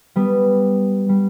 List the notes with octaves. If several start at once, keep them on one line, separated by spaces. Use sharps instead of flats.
G3 B3
G3